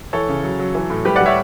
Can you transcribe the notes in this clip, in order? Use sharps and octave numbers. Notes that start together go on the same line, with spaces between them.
E3 A4 C#5
C#3
F#3
F#3
E3
A2
G3 G4 B4
D5 F#5
G3
C#5 E5